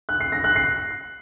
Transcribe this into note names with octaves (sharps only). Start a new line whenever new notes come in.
F#6
C7
A#6
F#6
C7